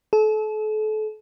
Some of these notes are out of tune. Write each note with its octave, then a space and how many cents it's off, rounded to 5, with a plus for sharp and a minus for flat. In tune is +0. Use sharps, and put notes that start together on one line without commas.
A4 -35